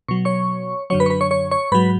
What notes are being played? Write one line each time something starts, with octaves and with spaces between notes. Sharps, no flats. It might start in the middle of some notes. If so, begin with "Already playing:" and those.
B2 F#3 C#6
C#5 C#6
F#2 D3 F#3 C#5 C#6
B4 B5
C#6
B4 B5
C#5 C#6
C#5 C#6
C#5 C#6
G#2 F#3 B4 B5